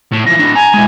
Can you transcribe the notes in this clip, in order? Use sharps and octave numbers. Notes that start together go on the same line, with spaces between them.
A2
E3 F3 A#6
A2 D4
G#5 A#5
G#3 E4